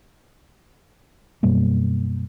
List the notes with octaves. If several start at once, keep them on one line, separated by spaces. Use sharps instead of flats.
F#2 B2 G3 A#3